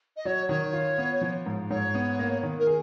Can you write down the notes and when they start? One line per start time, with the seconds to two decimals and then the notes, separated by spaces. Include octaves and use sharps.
0.16 D#5
0.25 F#3 C#5
0.49 D#3 C#5
0.73 F4
0.98 B3
1.21 F3
1.46 G#2
1.71 G#2 C#5
1.95 B3
2.19 A#3
2.43 D#3
2.59 A#4
2.67 G#4